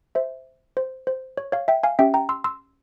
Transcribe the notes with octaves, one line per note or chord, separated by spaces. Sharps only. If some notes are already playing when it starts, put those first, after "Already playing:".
C5 E5
C5
C5
C#5
C#5 F5
E5 G5
F5 G#5
C#4 G4 E5 G5
G5 A#5
C6 E6
C6 E6